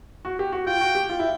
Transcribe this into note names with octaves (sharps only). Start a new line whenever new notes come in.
F#4
G4
F#4
F4 G5
F#4
G4
F4
E4